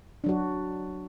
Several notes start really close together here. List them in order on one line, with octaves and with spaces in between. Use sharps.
D4 F#3 F#4